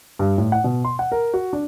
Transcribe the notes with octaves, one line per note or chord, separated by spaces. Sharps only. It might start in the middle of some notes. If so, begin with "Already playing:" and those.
G2
A2
F#5
B2
C6
F#5
A#4
F#4
D4